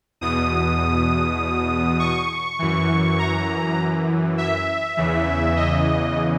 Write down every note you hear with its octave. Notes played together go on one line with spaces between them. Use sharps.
E2 B2 D#6
C#6
F#2 E3
A#5
E5
E2 C#3 E3
D#5